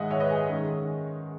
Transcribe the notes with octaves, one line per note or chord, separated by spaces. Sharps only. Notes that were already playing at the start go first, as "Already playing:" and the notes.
Already playing: G#2 D#3 G#3 D#5 E5 F#5 G#5
C#5 E5
B4 D#5
G#4
D#3 G#3 C#4